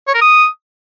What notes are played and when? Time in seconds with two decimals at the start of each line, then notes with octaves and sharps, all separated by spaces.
0.07 C#5
0.14 A#4
0.21 D#6